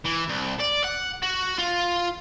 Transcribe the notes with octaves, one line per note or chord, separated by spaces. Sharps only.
E3
C2
D5
F#5
F#4
F4